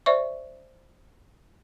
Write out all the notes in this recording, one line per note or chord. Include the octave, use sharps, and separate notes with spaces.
C5 D5 E5 C#6